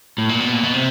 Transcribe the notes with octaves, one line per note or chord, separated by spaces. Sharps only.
A2
A#2
B2
A#2
B2
C3